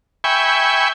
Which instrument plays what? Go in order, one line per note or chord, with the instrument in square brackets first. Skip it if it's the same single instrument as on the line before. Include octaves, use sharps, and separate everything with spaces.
[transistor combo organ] E5 G5 G#5 B5 C#6